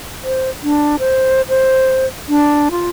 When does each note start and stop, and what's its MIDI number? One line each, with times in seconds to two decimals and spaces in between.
0.23 0.50 72
0.63 0.96 62
0.99 1.42 72
1.49 2.06 72
2.29 2.69 62
2.71 2.89 65